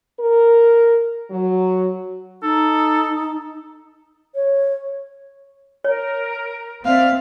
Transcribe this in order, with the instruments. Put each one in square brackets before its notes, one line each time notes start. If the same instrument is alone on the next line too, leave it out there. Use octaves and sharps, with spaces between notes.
[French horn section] A#4
F#3
[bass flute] D#4 [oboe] A4
[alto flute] C#5
[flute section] A#4 [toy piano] C#5
[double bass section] C4 [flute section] D5 E5 [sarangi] F5